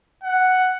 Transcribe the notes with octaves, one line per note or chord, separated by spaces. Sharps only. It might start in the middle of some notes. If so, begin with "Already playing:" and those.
F#5